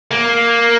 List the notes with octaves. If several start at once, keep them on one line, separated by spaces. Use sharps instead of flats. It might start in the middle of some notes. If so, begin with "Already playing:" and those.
A#3